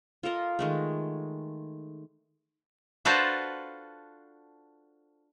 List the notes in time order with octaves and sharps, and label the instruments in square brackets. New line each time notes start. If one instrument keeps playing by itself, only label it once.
[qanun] F4 A4 A#4 D#5
D#3 G#3 A3
[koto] D4 F4 F#4 A4 B4 C5